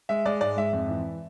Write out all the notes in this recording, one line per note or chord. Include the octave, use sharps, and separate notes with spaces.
G#3 E5
G#3 D5
G#2 D5
G#2 E5
F2 E5
E3